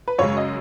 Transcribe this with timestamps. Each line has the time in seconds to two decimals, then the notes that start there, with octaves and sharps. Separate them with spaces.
0.08 B4
0.19 F#2 C#3 G#3 C#5
0.37 D#5